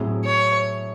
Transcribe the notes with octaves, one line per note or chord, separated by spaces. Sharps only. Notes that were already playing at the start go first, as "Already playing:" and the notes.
Already playing: A2 F#3 C4 E4 G#4
C#5